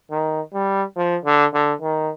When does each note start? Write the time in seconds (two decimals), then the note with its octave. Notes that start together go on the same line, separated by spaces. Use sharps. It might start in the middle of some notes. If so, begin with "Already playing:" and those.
0.11 D#3
0.54 G3
0.96 F3
1.25 D3
1.54 D3
1.81 D#3